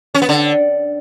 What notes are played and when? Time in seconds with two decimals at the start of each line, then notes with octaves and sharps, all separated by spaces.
0.14 C#4
0.22 B3
0.29 D3